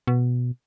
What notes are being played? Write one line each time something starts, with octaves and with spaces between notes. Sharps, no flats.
B2